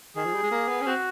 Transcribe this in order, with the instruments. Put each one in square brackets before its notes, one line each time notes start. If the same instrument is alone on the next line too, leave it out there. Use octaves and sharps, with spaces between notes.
[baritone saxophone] D#3 [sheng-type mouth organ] G#4
[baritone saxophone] F3
G3
G#3
A#3
B3
C#4
[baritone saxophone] C4 [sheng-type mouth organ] F#4